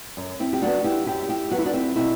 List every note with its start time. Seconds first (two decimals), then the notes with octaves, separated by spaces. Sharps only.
0.17 F#2
0.40 C4 E4
0.53 G4
0.61 F#3 B3 D4 F#4
0.84 E4 G4
1.06 F#2 E4 G4
1.29 E4 G4
1.51 F#3 B3 F#4
1.58 E4
1.65 D4 F#4
1.74 C4 E4
1.96 B2 C4 E4